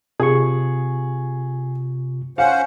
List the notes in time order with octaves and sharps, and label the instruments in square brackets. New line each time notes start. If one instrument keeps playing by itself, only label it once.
[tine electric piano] C3 F4 C#6 [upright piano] G#4
[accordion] C#4 C5 F#5 [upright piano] F5